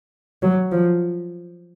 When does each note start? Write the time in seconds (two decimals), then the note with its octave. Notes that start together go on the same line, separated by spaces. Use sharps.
0.43 F#3
0.72 F3